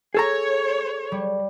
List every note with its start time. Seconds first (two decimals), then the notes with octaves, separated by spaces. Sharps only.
0.14 G#4 A4 C#5 A#5
1.12 G3